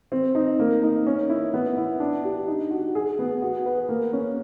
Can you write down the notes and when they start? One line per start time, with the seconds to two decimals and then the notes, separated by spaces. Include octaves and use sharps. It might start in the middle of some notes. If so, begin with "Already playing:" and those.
0.12 C4
0.35 D#4
0.59 A#3
0.83 D#4
1.07 C#4
1.29 E4
1.54 B3
1.77 E4
2.00 D4
2.24 G4
2.47 D#4
2.71 F#4
2.95 G#4
3.19 B3
3.42 F#4
3.66 B4
3.89 A#3
4.13 C#4